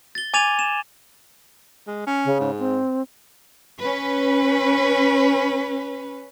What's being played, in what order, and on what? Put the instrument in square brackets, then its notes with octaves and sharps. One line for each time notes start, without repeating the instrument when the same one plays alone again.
[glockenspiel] A6 G7
G#5 D6 G#6 A6 D#7 F7
E7
[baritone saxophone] G#3
C#4
[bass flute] C#3
[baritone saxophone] G#2
[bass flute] C4
[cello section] C#4 B4